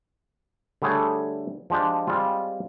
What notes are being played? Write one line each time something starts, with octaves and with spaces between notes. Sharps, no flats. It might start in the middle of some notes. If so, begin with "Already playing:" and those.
D3 G3 A3 G#4 C#5
F3 G#3 D4 G4
G3 G#3 C4 F4